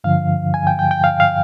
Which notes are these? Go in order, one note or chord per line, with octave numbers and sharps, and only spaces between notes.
G2 D3 F3 F5
G#5
G5
G5
G5
F5
F5